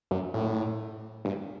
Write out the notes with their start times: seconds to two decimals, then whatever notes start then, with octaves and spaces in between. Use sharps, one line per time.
0.11 F#2
0.34 A2
1.25 G2